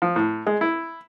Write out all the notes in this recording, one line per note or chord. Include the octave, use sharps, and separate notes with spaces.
F3
A2
G#3
E4